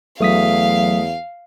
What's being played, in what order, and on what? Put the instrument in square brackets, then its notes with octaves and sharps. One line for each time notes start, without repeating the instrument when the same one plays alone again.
[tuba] E2 [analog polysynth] F#3 [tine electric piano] A3 D#6 B6 [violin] F5